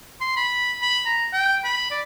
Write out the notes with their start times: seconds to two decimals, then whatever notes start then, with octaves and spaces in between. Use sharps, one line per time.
0.21 C6
0.36 B5
0.82 B5
1.06 A#5
1.33 G5
1.64 B5
1.91 D5